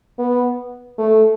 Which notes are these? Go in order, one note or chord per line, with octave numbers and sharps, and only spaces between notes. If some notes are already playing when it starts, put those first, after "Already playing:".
B3
A3